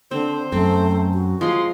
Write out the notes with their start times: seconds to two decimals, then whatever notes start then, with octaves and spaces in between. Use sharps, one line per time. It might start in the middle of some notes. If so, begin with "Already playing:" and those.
0.11 D3 C4 C5
0.52 F#2 A3 C4
1.14 F#4
1.41 F3 G#3 C6